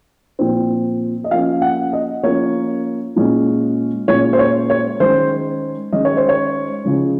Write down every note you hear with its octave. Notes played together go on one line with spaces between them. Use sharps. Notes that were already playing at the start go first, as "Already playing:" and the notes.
A#2 F3 C4
D#5
F3 A#3 C#4 F5
F#5
D#5
F3 A#3 C#4 C#5
A#2 G#3 C#4
A#2 G#3 C#4 C#5
C5
C#5
C#5
D#3 G#3 C#4 C5
D#3 G#3 C#4 D#5
C#5
C5
C#5
C#3 F3 G#3 C#4